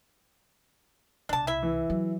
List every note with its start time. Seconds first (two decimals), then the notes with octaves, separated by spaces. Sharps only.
1.29 C2 B2 D4 A5
1.47 E4 E5
1.63 E3
1.90 F#3